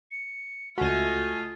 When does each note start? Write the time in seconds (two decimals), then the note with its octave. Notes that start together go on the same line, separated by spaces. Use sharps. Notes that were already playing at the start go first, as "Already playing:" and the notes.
0.11 C#7
0.78 C#2 A3 F4 F#4 D#5 G#5